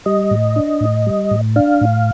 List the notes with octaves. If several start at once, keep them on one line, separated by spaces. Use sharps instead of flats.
G3 D#5
A2
D4
A2
G3
A2
D4 F5
A2